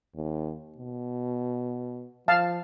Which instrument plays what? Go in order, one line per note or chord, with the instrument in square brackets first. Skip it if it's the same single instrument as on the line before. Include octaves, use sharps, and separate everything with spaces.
[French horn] D#2
B2
[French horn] F3 [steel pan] F5 A5